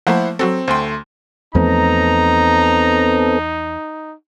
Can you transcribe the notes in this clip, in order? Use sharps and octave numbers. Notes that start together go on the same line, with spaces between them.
F3 A3 A#3 E4 C5 F#5
F#3 C4 F#4 A4
D2 A3 C5 G5 C6
E2 F3 A3 B3 C4 D#4 A4 A#5